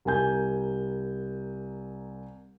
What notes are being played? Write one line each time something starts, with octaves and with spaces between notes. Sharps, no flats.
C2 A#4 G#5 G6